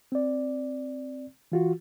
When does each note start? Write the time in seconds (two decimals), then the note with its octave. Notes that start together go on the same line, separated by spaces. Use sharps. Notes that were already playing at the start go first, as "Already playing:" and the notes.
0.12 C4 D5
1.52 E3 F4 F#4